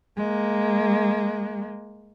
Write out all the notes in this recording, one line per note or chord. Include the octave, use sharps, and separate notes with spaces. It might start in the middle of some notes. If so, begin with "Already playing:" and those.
G#3 A#3